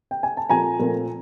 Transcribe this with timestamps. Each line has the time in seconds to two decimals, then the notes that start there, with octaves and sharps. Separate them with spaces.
0.11 G5
0.23 G#5
0.37 A5
0.50 A#2 F3 A3 C4 G#5 A#5
0.79 A#2 F3 A3 C4